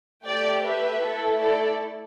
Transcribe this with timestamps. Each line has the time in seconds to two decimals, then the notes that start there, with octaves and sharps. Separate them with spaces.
0.25 A3 G4 D5 G5
0.64 B4 E5
1.02 A3 E4 A4
1.40 A4 D5